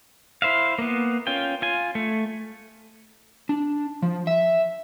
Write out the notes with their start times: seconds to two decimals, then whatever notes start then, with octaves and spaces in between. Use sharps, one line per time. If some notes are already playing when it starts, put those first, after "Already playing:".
0.42 E4 C5 E5 F5
0.78 A#3 B3
1.27 C#4 F4 G5
1.62 F4 G#5
1.95 A3
3.49 D4
4.02 F3
4.27 E5